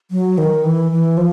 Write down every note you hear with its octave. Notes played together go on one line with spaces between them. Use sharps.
F#3
D#3
E3
E3
F3